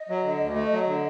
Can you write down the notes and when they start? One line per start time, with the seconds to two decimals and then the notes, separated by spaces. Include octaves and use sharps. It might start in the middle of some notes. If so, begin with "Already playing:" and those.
Already playing: D#5
0.09 F#3
0.24 D3
0.40 D2
0.55 A3
0.72 F#3
0.86 D3